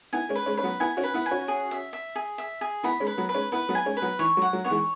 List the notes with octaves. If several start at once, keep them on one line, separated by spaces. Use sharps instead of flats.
B3 E4 G#5
G#3 C#4
B4
G#3 C#4
C#4 B4
F#3 B3
B3 E4 G#5
C#4 F#4
B4
B3 E4
G#5
C#4 F#4
G#4
E5
E5
G#4
E5
G#4
B3 E4 B5
G#3 C#4
B4
F#3 B3
B4
G#3 C#4
B3 E4 B4
F#3 B3
G#5
G#3 C#4
B4
F#3 B3
E3 C#5
F#3
F#5
F#3
B3 C#5
E3 G#3